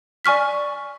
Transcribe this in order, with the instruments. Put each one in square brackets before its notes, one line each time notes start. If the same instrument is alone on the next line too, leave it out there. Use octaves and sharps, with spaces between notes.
[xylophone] D5 G#5 C#6 F6 B6